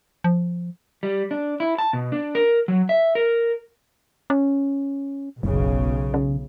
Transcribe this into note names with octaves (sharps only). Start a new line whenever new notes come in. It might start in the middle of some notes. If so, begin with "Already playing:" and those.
F3
G3
D4
E4
A5
B2
D4
A#4
F#3
E5
A#4
C#4
F#1 B1 C#3
C#3